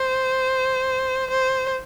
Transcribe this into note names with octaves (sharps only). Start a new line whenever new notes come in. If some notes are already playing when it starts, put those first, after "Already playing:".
Already playing: C5
C5